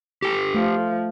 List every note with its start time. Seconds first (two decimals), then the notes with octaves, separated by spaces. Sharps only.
0.22 G4 A4
0.54 F3 A3